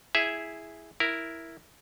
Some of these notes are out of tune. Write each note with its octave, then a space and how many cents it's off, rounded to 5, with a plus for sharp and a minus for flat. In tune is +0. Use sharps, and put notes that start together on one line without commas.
E4 +0 G#4 +0 E5 +0
E4 +0 A#4 +0